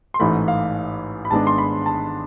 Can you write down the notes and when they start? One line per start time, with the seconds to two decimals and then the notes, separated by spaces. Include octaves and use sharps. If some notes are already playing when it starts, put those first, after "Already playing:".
0.14 C6
0.19 A1 G#2 E3 A3 B5
0.48 F5
1.25 B5
1.31 G#1 G#2 G#3 B3 D4 A5
1.47 C6
1.58 B5
1.86 A5